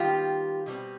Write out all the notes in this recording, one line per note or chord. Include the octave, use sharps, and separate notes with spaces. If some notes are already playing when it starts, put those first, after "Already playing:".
Already playing: D#3 G3 B3 F4 G4
B2 G3 C4